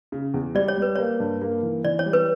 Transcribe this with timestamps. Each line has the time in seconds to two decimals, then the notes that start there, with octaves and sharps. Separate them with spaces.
0.12 C#3
0.34 E2
0.55 G3 D5
0.68 C#5
0.77 G3
0.82 B4
0.96 A#3 C#5
1.20 G2
1.42 A#3
1.63 E3
1.85 E3 D5
1.99 C#5
2.05 G3
2.13 B4